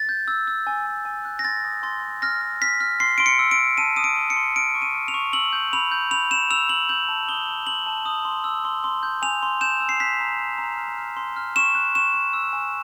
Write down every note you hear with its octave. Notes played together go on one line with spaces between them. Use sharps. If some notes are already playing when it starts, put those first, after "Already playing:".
Already playing: A6
G6
E6
E6
G#5
G#5
G#5
F#6
A#6
C6 A6
D#6
C6 A6
C6
F6 A#6
F6
F6 B6
F6
C6 C7
C6 D7
C#7
E6
D7
C6
A5 D#7
D#6 D#7
D7
C6
C#7
C6
F6 D7
C#6
D#7
F6
F7
C#6
E6 F#7
G6
B5 F7
G6
B5 F7
G6 E7
E6 F7
G6 F#7
G6 F#7
A5
D#6 G7
A5
C6 F#7
A5
D#6
C6
E6
C6
C6
G6
G#5 F7
C6
G6 E7
E6
C7
F#6 B6
A#5
A#5
A#5
F6
F6
C6
F6
C#6 E7
F#6
C#6 E7
C#6
E6
G#5